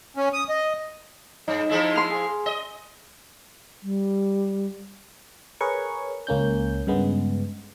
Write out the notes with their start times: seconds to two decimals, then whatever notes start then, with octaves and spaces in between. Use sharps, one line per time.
0.17 C#4
0.33 D#6
0.49 D#5
1.48 G2 D#4
1.69 F3 G#3 E4
1.96 C6 F6
2.11 G#4
2.46 D#5
3.82 G3
5.61 G#4 A#4 B4 C#5 C#6
6.27 C#2 A#3 C#4 G6
6.87 G2 C#3 G#3 B3